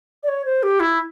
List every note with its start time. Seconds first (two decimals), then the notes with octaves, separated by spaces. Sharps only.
0.23 D5
0.28 C#5
0.45 C5
0.63 G4
0.80 E4